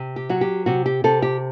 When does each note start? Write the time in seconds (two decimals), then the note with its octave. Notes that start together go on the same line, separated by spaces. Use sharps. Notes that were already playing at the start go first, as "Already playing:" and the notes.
Already playing: C3
0.16 G4
0.29 F#3 F#4
0.41 G4
0.66 C3 F#4
0.86 G4
1.04 C3 A4
1.22 G4